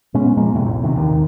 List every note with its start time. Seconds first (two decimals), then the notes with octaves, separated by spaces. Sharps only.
0.14 A#2 G#3 B3 C#4
0.37 A#2 F3 G#3 A#3
0.54 F2 A2 C3
0.66 B1 A#2
0.83 A1 C3 D#3
0.96 D#2 D#3